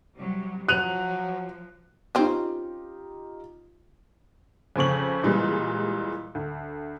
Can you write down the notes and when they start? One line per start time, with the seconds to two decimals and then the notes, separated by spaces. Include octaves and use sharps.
0.17 C3 F#3 G3
0.68 F3 F#3 F#6 D#7 F7
2.15 C4 C#4 D#4 F4 G4
4.76 F2 C#3 C4 C#6 F#7
5.23 A#2 E3 G3 G#3
6.35 D2